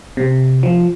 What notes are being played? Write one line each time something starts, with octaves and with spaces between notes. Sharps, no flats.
C3
F3